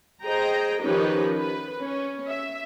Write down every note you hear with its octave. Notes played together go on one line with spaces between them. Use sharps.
G#4 C5 D#5 G5 A#5
D#3 F3 C#4 D#4 G4 B4
B4
C#4
E5